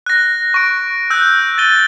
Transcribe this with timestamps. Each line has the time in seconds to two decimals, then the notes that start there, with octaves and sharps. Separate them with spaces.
0.06 F#6 A#6
0.54 C#6 D7
1.10 E6 F#6 G6
1.58 A6 D#7 G7